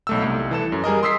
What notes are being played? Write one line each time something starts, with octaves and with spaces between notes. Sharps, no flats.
B1 A3 E6
C2
E3 A4 E7
F#2
G3 G#4 A#4 D#5
C6 D#6 E6 B6 C7